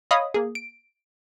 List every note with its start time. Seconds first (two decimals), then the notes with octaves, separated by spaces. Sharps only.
0.11 C#5 D#5 F5 B5 D#6
0.34 A#3 G#4
0.55 D7